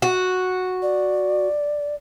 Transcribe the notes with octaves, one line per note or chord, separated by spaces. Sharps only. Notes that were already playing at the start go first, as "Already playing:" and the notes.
F#4
D5